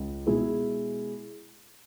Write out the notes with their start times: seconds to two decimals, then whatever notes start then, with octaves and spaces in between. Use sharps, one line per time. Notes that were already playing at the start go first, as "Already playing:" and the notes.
Already playing: C#2 C#3
0.27 B2 G#3 E4 G#4